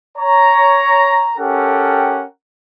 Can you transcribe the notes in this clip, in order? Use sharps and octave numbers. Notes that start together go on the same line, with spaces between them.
C#5 A#5
C#4 G4 A4 A#4 F#5 G5